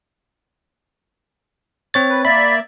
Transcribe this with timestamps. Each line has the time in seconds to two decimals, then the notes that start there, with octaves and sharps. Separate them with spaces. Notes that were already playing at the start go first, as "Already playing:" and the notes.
1.94 C4 C#5 A6
2.09 B4
2.25 A#3 D5 E5 B5